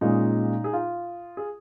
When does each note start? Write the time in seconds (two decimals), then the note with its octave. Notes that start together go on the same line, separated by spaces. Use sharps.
0.01 A#2 G#3 C#4 D#4
0.64 G#4
0.73 F4
1.37 G#4